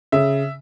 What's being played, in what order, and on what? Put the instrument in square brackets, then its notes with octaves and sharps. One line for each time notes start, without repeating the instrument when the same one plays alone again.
[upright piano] C#3 E5